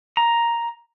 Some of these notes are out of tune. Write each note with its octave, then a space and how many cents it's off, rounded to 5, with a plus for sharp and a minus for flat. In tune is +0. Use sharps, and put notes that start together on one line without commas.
A#5 +5